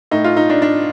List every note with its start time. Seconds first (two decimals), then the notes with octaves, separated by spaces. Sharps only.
0.11 A2 D#4
0.24 F4
0.37 D#4
0.50 D4
0.62 D4